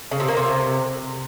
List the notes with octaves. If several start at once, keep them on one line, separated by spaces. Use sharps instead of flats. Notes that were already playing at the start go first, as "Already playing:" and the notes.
C#3
C3
A#3
C3